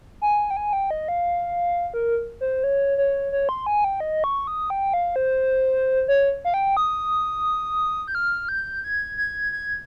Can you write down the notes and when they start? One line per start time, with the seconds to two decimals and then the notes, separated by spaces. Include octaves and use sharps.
0.21 G#5
0.50 G5
0.57 G#5
0.73 G5
0.91 D#5
1.08 F5
1.94 A#4
2.41 C5
2.64 C#5
2.98 C#5
3.32 C#5
3.49 C6
3.66 G#5
3.84 G5
4.00 D#5
4.24 C#6
4.47 D#6
4.70 G5
4.94 F5
5.16 C5
6.08 C#5
6.45 F5
6.54 G5
6.77 D#6
8.08 G6
8.15 F6
8.49 G6
8.84 G#6
9.18 G#6
9.52 G#6